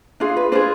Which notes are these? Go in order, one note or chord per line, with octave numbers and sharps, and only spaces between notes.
D4 F4 G#4 F5
B4
D4 F4 G#4 C5